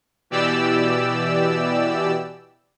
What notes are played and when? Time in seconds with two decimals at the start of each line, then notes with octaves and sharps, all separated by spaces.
0.30 B2 E3 G4 D5 E6